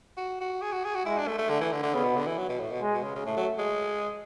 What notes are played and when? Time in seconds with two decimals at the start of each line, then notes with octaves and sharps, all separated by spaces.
0.17 F#4
0.40 F#4
0.62 G#4
0.72 F#4
0.84 G#4
0.95 F#4
1.05 G#3 E4
1.17 D4
1.28 A3
1.38 A3
1.49 D3 A3
1.61 E3
1.72 D3
1.83 D3
1.94 C#3 B3
2.04 B2
2.16 D3
2.27 E3
2.38 F#3
2.49 B2
2.59 A2
2.71 B2
2.82 G#3
2.93 B2
3.03 C#3
3.15 C#3
3.26 A2 A3
3.37 F#3
3.58 G#3